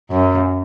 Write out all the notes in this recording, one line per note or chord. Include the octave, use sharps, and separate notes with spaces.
F#2